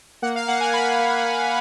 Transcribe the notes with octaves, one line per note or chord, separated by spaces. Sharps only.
A#3 F#5
F5
A#3 F#5
G#5
A#3 B5
A#3
A#3